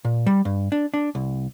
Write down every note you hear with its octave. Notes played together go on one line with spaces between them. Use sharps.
A#2
G3
G2
D4
D4
C2